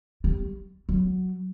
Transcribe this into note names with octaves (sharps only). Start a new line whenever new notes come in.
G3
F#3